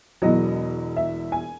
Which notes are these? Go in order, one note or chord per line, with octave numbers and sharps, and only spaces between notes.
E1 E2 B2 F#3 D#5
E5
G#5